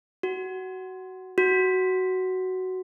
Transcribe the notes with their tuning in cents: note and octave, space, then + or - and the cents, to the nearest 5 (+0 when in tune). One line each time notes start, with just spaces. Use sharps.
F#4 +15
F#4 +10